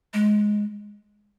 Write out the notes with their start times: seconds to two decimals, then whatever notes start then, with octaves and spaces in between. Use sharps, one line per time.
0.14 G#3